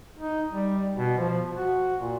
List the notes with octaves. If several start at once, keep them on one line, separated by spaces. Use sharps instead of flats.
D#4
G3
B2
F3
F#4
A#2